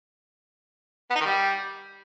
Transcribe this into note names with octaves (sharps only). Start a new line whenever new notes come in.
B3
D#4
D#3
G3